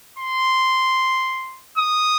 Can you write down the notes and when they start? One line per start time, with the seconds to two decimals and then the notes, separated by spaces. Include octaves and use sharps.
0.19 C6
1.78 D#6